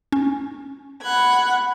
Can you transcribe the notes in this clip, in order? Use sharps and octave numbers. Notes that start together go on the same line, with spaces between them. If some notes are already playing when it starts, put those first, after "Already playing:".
C#4
F#5 B5 F#6 G#6